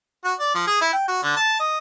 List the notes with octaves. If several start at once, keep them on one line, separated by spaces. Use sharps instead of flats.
F#4
D5
F3
G#4
E4
G5
F#4
D3
A5
D#5